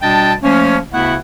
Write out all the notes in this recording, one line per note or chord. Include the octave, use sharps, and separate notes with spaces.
B2 G3 D4 D#5 G5 A5
F3 A3 A#3 C#4
D2 C#3 A3 B3 E4 F#5